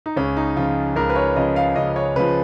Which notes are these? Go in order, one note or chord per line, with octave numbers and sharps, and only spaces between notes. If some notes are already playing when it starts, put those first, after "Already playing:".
D#4
C#2 C#4
D#4
C#3 F3 F4
C#2 A#4
B4
C#5
C#3 F3 D#5
F5
C#2 D#5
C#5
C#3 F3 B4